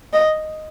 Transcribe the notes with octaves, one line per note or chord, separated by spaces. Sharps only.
D#5